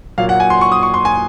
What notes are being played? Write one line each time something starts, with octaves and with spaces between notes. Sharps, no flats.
A#2 F#3 A#3 F5
F#5
G#5
C6
C#6
D#6
C#6
C6
G#5